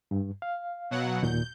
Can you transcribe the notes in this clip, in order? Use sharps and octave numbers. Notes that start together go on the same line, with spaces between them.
G2
F5
B2 F#3 F#5
D#2 A#2 G6